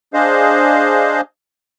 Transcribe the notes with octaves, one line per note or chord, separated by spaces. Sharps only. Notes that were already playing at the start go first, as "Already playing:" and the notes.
D4 G#4 C5 D#5 F5